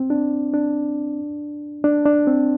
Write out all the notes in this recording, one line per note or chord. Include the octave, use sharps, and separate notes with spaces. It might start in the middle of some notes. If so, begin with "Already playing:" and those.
Already playing: C4
D4
D4
D4
D4
C4